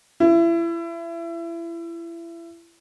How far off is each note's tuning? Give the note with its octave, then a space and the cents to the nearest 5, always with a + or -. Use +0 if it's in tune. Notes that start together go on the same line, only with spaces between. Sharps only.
E4 +30